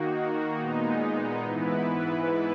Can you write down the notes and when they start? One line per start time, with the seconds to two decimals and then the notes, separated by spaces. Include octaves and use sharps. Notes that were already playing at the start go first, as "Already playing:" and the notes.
Already playing: D#3 A#3 D#4 F#4
0.60 A#2 G#3 B3 D#4
1.44 G#2 E3 B3 E4 B4